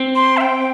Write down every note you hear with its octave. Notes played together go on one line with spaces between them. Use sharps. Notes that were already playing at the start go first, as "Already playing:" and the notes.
Already playing: C4
C6
E5
G5